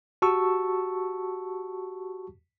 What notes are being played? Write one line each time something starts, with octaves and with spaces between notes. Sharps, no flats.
F#4 G4 A5 C#6 E6